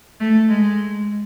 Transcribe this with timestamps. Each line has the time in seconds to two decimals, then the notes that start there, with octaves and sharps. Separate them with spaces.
0.20 A3
0.49 G#3